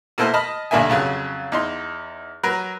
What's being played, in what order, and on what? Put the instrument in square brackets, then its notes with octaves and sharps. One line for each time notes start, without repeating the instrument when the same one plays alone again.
[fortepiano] B2 A3 A#3 E4 C5 F6
D#5 A5 B5 F6
B1 G2 D3 A#3 E5 G#5
F2 C#3 F#3
E2 D#4 C6
F#3 A#4 B4